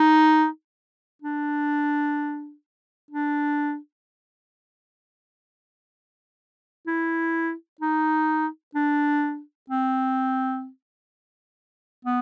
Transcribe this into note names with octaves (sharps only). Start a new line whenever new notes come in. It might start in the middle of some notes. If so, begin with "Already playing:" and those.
Already playing: D#4
D4
D4
E4
D#4
D4
C4
B3